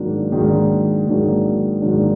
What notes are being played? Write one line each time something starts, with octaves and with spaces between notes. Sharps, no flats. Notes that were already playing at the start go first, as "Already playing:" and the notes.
Already playing: G#2 D#3 F#3 A#3 D4
G#2 D#3 F#3 A#3 D4
G#2 D#3 F#3 A#3 D4
G#2 D#3 F#3 A#3 D4